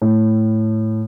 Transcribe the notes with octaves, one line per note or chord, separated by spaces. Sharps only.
A2